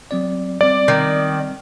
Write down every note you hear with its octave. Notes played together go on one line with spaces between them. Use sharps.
F#3 C4 D5
G3 C4 D5
D#3